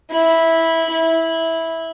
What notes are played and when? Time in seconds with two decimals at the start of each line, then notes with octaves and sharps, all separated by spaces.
0.11 E4
0.91 E4